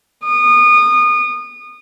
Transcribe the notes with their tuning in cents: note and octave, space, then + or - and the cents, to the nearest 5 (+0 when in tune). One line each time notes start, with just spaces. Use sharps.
D#6 -30